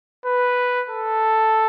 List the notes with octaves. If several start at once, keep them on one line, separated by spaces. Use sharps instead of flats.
B4
A4